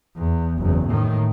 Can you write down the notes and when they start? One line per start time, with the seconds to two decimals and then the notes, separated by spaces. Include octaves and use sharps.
0.16 E2
0.58 F#1 E2
0.87 A2 D#3